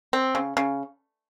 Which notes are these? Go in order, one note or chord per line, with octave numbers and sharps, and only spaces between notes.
C4
C#3
C#3